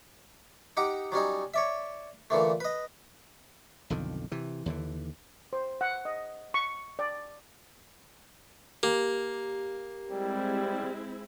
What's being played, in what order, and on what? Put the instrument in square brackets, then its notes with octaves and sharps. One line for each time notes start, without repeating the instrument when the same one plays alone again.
[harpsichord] D#4 G4 F#5 D6
F#3 G3 C#4 D#4
C#5 D5 E5
A#2 D3 E3 A3
B4 D#5
[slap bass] B1 F2 D3 D#3
C3 E3
D#2 D3 E3
[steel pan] C5
F#5
D#5
C#6
D5
[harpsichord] A#3 [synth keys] G4
[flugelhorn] G3 [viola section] G#3 C4 E4